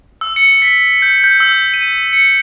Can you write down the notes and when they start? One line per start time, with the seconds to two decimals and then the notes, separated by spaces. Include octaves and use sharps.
0.21 E6
0.36 C#7
0.62 B6
1.02 G6
1.24 G6
1.40 E6
1.74 D#7
2.13 C#7